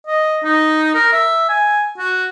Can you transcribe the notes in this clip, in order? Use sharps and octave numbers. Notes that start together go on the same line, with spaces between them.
D#5
D#4
A#4
E5
G#5
F#4